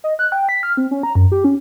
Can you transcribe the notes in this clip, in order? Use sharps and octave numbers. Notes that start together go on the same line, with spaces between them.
D#5
F#6
G5
B6
F6
C4
C#4
A#5
F#2
G4
C#4